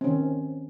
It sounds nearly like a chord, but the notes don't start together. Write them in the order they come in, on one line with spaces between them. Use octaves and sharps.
C4 C#4 D#3